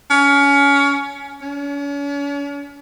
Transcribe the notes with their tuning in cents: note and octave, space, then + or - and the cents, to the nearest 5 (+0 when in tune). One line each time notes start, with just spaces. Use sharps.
C#4 +25
C#4 +45